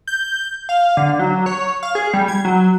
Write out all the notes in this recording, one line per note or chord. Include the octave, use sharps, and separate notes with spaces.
G6
F5
D3
F#3
C#5
F5
G#4
G3
G#6
F#3